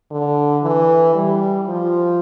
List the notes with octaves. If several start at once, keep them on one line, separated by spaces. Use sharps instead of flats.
D3
E3
G3
F3